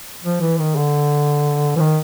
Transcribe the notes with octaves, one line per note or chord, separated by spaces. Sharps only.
F3
E3
D#3
D3
E3
D#3